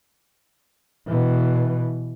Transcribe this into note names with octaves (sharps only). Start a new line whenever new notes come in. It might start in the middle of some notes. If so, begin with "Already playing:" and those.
B2 E3